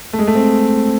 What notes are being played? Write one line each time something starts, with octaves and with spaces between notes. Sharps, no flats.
A3
G#3
A3
C4